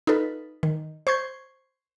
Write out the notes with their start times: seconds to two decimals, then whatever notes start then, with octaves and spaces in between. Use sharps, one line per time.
0.07 D#4 F4 A4 B4
0.63 D#3
1.07 C5 C#6 G6 G#6